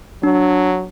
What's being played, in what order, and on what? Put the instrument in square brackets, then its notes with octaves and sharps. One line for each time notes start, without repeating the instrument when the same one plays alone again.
[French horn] F#3 [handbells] D4